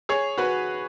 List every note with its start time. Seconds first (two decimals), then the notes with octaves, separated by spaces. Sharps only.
0.09 G#4 C#5
0.38 F#4 B4